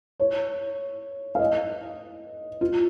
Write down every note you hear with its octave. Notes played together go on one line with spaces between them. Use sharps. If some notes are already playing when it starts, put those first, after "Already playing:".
C#5
F5
D#5
F4